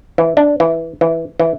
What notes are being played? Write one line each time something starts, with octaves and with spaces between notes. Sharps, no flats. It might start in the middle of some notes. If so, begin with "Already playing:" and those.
E3
D4
E3
E3
E3